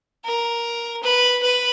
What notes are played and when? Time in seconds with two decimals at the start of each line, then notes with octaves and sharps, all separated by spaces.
0.25 A#4
1.03 B4
1.42 B4